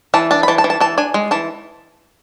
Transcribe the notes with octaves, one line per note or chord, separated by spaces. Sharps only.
E3 A5
D4 A5
B5
E3 A5
A5
E3
A5
E3 A5
D4 G#5
G#3
E3 A5